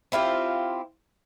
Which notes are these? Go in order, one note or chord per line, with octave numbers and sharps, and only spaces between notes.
C4 E4 F4 G4